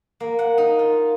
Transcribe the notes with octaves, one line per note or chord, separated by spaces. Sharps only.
A#3
F#5
D#4
F4